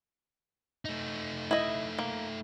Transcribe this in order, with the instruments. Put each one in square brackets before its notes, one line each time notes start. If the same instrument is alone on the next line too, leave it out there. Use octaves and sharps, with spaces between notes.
[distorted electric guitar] A3 D#4
[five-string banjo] E4 D#5
A#3